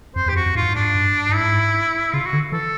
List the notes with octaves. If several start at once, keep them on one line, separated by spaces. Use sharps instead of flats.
F2 C5
E2
G4
F#2
F2 F#4
F2
G#2 F4
G2
G#2
D4
G2
G2
G#2 E4
C#3 F4
F#4
D3
E3 A4